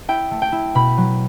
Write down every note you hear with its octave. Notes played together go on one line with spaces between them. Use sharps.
E4 G5
A3
G5
E4
B2 B5
F#3